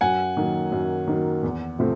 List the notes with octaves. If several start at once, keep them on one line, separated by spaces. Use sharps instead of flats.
F#2 F#5 G#5
D#3 F#3 A#3
F#2
D#3 F#3 A#3
E2
C3 F3 A3 C4